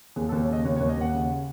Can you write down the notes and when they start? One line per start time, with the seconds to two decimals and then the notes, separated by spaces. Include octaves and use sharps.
0.16 D#2 G#4
0.29 A4
0.32 D#2
0.41 C#5
0.49 C#3 D#5
0.65 D#2 C#5
0.76 C#5
0.80 D#2
0.89 D#5
0.97 D#2 F#5
1.13 C#3